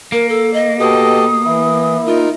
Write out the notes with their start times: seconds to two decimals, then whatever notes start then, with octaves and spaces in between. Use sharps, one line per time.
0.12 A#3 A#4
0.29 A4
0.53 D#5
0.80 B2 G4 A4 D#5 D#6
1.46 E3 E4
2.06 D#4 F4 A#4